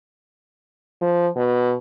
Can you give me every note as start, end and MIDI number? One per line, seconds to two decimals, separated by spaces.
1.01 1.27 53
1.36 1.74 47